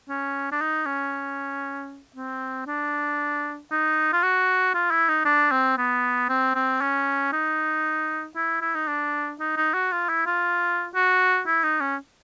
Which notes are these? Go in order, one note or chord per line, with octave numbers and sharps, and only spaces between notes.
C#4
D4
D#4
C#4
C4
D4
D#4
F4
F#4
F4
E4
D#4
D4
C4
B3
C4
C4
C#4
D#4
E4
E4
D#4
D4
D#4
D#4
F#4
F4
E4
F4
F#4
E4
D#4
C#4